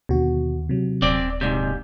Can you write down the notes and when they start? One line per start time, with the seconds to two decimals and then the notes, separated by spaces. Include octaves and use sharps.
0.09 D#2 B2 D3 F#4
0.69 C3 F#3
1.02 D#1 C4 D5
1.41 G#2 C3 D5 G6